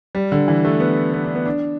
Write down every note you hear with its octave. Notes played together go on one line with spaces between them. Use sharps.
G3
D3
E3
A3
B3
B3
D4
B3
D4